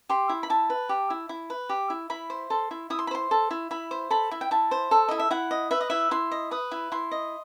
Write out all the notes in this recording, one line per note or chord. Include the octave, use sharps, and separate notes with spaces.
G4 C6
E4
B5
E4 A5
B4
G4
E4
E4
B4
G4
E4
E4 B5
C5
A4 C6
E4
E4 D#6
C6
B5
C5 C6
A4
E4
E4 B5
C5
A4 B5
E4
G5
E4 A5
C5
A4
E4 D#5
E5
E4 F#5
D#5
B4 E5
D#5
E4 E5
E4 C6
D#5
B4 D#6
E4
E4 C6
D#5